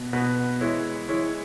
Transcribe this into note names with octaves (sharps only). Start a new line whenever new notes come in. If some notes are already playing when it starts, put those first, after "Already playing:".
Already playing: B2 B3 F#4
B2 B3 F#4 B4
E3 G#3 E4 C#5
E3 G#3 E4 C#5